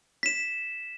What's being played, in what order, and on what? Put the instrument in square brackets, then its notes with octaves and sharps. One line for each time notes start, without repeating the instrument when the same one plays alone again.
[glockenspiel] B6 E7